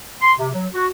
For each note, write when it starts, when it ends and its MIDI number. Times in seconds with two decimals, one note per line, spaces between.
0.22 0.33 84
0.39 0.48 48
0.53 0.66 54
0.74 0.88 66